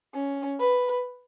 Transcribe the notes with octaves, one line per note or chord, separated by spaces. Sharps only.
C#4
B4